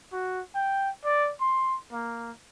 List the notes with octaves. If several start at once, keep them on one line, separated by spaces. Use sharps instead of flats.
F#4
G5
D5
C6
A#3